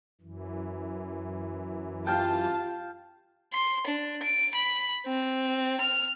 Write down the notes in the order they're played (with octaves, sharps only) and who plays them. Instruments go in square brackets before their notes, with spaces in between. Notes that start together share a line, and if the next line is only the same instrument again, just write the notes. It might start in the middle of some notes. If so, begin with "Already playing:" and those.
[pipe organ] F#2 E3
[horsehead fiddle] F4 G4 [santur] F5 G5 [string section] A5
[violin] C6
D4
D7
B5
C4
F6